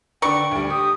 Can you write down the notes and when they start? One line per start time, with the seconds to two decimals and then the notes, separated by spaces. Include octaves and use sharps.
0.22 D3 D4 B4 G5 C#6
0.51 D2 G3
0.70 G4 D#6